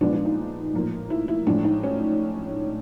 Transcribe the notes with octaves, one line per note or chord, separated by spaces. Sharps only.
A#2 F3 G#3 B3 D4
D4
D#4
A2 F3 A#3
E4
E4
A2 F3 G#3 D4
D#4
C#4